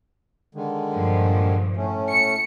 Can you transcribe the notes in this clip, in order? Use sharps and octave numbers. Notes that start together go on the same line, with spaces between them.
D3 D#3 G#3
G2 A#2 F3
A2 A3 C#4
C#7